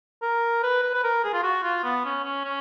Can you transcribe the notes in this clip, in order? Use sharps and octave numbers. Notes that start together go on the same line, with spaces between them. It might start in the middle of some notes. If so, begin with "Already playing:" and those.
A#4
B4
B4
B4
A#4
G#4
F4
F#4
F4
B3
C#4
C#4
C#4